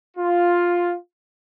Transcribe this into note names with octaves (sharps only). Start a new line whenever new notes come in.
F4